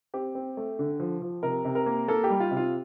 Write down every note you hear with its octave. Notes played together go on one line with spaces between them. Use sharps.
C4 G4
C4
A3
D3
F3
F3
C3 A#4
C3
A#4
A#3
A#3 A4
G4
G3
F4
C3
F4